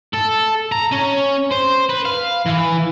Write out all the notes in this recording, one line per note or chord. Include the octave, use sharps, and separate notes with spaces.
A4
A#5
C#4
C5
B4
F5
E3